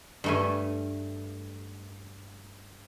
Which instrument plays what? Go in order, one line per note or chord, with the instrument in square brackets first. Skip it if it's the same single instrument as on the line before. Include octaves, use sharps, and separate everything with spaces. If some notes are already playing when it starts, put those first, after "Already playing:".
[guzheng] G2 A3 G#5